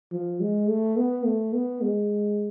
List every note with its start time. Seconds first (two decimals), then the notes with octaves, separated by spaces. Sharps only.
0.12 F3
0.40 G#3
0.69 A3
0.97 B3
1.25 A3
1.53 B3
1.81 G#3